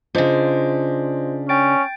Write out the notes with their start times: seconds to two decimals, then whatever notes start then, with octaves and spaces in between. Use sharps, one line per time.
0.15 C#3 D4 F4 C5 D#5
1.49 C#4 G5 A6 D7